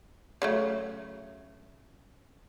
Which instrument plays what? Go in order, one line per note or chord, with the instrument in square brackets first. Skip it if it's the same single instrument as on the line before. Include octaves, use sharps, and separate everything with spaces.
[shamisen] C#3 F#3 A3